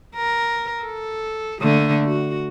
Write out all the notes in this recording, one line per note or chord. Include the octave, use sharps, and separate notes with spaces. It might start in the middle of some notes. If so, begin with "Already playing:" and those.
A#4
A4
D3 A3 A#3
F#4